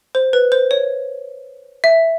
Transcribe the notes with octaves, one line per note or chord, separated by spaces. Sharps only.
C5
B4
C5
C#5
E5